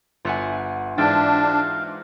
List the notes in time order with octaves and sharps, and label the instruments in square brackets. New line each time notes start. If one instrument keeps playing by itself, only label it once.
[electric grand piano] G1 G#5 [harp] F4 E5 F#5
[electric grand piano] G#2 E3 [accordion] D4 [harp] E5 G5 A6 [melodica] F5